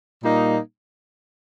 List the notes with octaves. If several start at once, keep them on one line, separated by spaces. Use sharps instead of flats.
A#2 G3 A#3 D#4